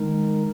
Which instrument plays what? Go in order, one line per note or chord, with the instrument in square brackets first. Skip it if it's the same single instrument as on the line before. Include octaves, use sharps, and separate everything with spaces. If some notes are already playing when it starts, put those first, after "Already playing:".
Already playing: [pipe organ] D#3 G#3 D#4 A#4